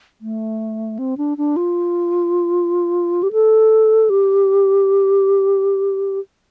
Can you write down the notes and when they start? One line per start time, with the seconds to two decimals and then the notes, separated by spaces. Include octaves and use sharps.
0.21 A3
0.99 C4
1.18 D4
1.38 D4
1.56 F4
3.23 G4
3.33 A4
4.10 G4